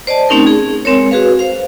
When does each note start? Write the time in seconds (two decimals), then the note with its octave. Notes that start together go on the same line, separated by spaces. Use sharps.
0.07 C5 D5 D#5 A5
0.29 A3 C4 C#4 D#4 G4 A#4
0.47 G#4
0.85 G#3 C4 A#4 C#5
1.11 F#4 G#4 B4 F5
1.39 C5 F5